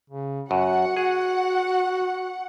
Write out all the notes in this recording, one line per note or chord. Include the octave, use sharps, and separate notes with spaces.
C#3
F#2 F#4 F#5
F#4 G#4